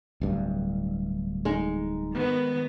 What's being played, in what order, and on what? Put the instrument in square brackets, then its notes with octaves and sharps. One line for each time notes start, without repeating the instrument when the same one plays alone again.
[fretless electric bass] D1 G2
[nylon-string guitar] G#3 D#4
[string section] G#2 D#3 B3